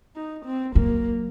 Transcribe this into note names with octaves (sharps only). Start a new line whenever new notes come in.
D#4
C4
F#3 A#3